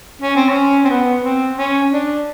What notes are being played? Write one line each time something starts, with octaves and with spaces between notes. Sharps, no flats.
C#4
C4
C#4
C4
B3
C4
C#4
D4